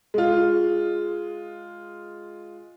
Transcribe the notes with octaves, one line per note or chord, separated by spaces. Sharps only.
G#3 F4